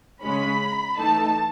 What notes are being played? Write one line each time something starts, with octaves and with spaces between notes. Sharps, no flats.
C#3 G#3 C#4 B5
E3 A3 D#4 A5